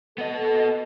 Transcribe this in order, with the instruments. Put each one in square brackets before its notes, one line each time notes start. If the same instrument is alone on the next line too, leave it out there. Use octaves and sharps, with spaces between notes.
[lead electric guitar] B3 D#5 [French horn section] A4